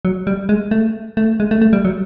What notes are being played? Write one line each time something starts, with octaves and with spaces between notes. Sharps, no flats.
F#3
G3
G#3
A3
A3
G#3
A3
A3
G3
F#3